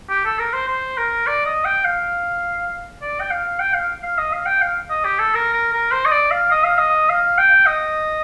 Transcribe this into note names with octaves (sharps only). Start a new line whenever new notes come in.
G4
A4
A#4
C5
C5
A#4
D5
D#5
G5
F5
D5
G5
F5
G5
F5
F5
D#5
F5
G5
F5
D#5
G4
A4
A#4
A#4
A#4
C5
D#5
D5
F5
D#5
F5
D#5
F5
G5
D#5